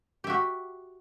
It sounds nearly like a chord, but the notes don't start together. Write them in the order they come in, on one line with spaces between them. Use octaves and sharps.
G4 E5 F#4